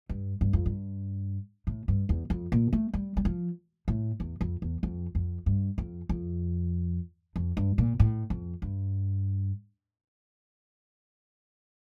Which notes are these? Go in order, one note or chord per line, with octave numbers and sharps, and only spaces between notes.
G2
G2
F2
G2
A2
G2
E2
F2
A#2
A3
G3
G3
F3
A2
E2
F2
E2
F2
F2
G2
F2
F2
F2
G2
A#2
A2
F2
G2